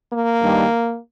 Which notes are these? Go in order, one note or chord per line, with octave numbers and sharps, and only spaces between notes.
A#3
G2 D#3 G3